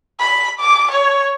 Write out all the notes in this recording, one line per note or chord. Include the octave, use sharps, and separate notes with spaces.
B5
D6
C#5